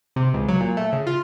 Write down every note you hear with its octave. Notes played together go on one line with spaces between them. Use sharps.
C3
C#2
F#3
A#2
A3
C#3
F4